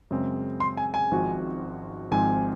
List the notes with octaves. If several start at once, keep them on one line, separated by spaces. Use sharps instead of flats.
F#2 C#3 G#3 C4
C6
G#5
G#5
G#1 G#2 F3 C4 F#4
G#1 G#2 F3 C4 G#5